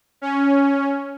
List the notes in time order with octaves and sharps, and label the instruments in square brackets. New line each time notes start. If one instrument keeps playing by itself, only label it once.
[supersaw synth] C#4